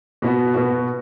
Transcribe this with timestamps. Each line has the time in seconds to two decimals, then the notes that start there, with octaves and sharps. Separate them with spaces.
0.22 B2 B3 F#4
0.54 B2 B3 F#4